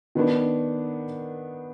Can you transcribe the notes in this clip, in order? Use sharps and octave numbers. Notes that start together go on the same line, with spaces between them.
D#3 B3 D4